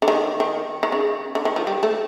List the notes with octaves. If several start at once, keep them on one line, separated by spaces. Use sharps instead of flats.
D3
D#3
D#3
D#3
C#3
D3
D#3
F3
G3
A3